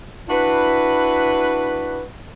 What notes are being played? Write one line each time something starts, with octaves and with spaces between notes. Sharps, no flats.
D4 E4 F#4 B4